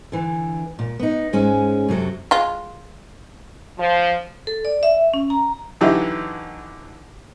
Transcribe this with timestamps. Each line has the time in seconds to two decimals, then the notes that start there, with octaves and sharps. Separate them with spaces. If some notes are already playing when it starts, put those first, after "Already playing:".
0.12 D3 E3
0.79 A#2
0.99 B3 D#4
1.33 G#2 G#3 C#4
1.88 F#2 C3 F#3 A4
2.31 G#3 F4
3.79 F3
4.47 A4
4.65 D5
4.83 E5
5.14 C#4
5.30 A#5
5.81 D3 E3 F#3 D#4 E4 G4